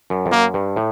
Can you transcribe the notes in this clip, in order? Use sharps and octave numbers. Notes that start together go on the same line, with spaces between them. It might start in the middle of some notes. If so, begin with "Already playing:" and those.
F#2
F2
F#2 A#3
G2
A2